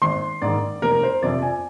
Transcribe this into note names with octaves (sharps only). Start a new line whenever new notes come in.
G#1 C6
G#2 D#3 D5
F1 A#4
C5
F2 C3 F3 D5
G#5